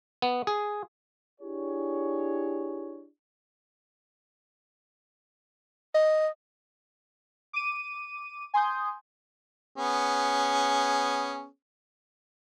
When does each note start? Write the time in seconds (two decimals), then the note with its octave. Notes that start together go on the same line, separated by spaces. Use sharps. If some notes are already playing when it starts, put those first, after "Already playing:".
0.22 B3
0.47 G#4
1.40 D4 E4 G4 G#4 C#5
5.95 D#5
7.53 D6 D#7
8.54 G#5 C6 D#6 G6
9.77 B3 C#4 G#4